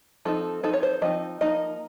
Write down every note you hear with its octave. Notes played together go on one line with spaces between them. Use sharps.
F3 C4 D#4 A4
F3 C4 D#4 A4
C#5
C5
F3 C4 D#4 D#5
F3 A#3 D#4 D#5